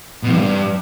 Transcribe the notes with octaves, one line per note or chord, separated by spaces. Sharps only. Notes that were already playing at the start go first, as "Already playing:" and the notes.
B2
E2
G2